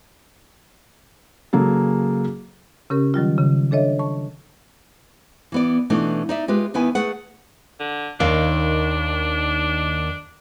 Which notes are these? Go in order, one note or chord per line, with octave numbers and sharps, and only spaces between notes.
C#3 F#3 A#3 G#4 A4
C#3 C#4 G4 A#4
D#3 F#3 G3 F4
C#3
D4 A4 C#5 D#5 E5
A5 C#6
E3 B3 D5
B2 E3 A3 D4 D#4
D#4 D5 E5
G#3 F4 G4 B4
D#2 D#3 B3 E4 B4 G#5
A3 G#4 B4 F#5
D3
D#2 D#3 D4 F5